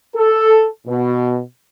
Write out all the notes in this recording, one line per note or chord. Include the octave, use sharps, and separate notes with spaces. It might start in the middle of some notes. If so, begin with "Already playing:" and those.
A4
B2